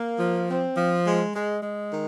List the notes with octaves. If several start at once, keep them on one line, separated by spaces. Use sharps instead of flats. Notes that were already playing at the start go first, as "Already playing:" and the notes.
Already playing: A#3
F3
C4
F3
G#3
G#3
G#3
D#3